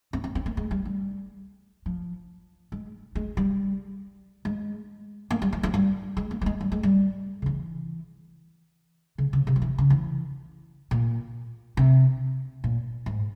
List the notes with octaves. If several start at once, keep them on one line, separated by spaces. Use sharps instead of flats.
C4
C4
C4
A#3
G#3
G3
G3
F3
G#3
G#3
G3
G#3
A#3
G3
E3
F3
G3
G#3
A#3
G3
G#3
G3
G#3
G3
C#3
E3
C#3
C#3
C3
F3
E3
C#3
E3
A#2
C3
A#2
G#2